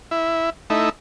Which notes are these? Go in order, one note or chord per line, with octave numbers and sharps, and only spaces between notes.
E4
A3 D#4 E4